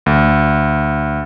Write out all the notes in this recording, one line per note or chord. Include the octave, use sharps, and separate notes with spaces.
D2